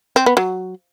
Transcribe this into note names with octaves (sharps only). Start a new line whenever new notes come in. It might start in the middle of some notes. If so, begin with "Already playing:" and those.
C4
B3
F#3